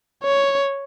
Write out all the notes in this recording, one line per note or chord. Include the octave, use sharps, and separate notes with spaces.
C#5